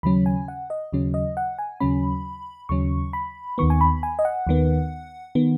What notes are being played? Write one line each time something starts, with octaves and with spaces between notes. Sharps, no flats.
D#2 C#3 F#3 C#4 B5
G#5
F#5
D#5
D#2 C#3 F#3 C#4
D#5
F#5
G#5
D#2 C#3 F#3 C#4 B5
D#2 C#3 F#3 C#4 C#6
B5
D#2 D#3 B3 C#6
G#5
B5
G#5
D#5
F#5
D#2 D#3 B3
D#3 B3